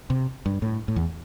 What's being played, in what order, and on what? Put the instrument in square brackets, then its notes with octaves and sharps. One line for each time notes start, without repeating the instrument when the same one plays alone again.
[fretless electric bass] C3
G2
A2
A2
E2